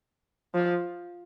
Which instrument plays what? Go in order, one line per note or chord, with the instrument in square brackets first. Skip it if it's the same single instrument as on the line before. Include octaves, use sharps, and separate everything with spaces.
[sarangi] F3